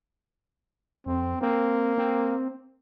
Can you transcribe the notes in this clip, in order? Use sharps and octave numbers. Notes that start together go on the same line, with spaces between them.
F2 C4
A#3 C4
C4